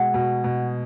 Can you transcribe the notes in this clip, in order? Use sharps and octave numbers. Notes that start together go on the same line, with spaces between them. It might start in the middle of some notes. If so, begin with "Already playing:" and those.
Already playing: B2 G#3 F#5
B2
B2